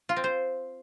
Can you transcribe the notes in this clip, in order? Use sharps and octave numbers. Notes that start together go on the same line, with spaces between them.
F4
C4
C5